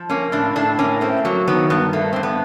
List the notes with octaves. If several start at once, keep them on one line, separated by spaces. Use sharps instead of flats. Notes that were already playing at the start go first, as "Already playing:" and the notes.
Already playing: F3
A#3 C#4
A2 D4
A2 D4
A#3 C#4
A3 C4
F#3 A#3
D#3 B3
G2 B3
A3 A#3
G2 C4
B3